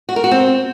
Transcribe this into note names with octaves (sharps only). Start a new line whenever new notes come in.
F#4
A#4
F#4
C4